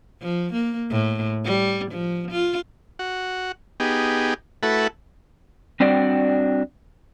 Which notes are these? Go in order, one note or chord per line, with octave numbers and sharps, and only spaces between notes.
F3
A#3
A2
G3
F3
F4
F#4
B3 D#4 G4 G#4
A3 E4 F#4 A4 B4
G3 C4 D4 F#4 D5 G5